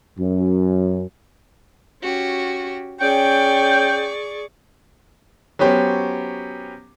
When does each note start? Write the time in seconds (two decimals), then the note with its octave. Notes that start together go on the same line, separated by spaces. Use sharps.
0.19 F#2
2.02 C#4 F#4 G4
3.01 C#4 G#4 D5 G5 C#6
5.59 F#3 B3 C#4 G4 C5